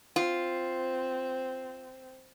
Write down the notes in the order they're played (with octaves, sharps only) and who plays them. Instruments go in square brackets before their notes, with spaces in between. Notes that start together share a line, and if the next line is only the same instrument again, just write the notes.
[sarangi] C4 [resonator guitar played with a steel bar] F4